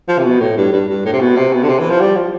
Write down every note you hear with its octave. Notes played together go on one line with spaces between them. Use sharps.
F3
C3
B2
A2
G2
G2
G2
A2
C3
B2
C3
B2
D3
C3
E3
F3
G3
F3